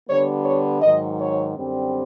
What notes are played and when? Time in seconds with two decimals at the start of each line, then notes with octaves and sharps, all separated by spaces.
0.08 D3 G3 B3 C#5
0.45 C#5
0.81 G#2 D#3 F#3 D#5
1.19 C#5
1.55 F#2 D3 G3 C4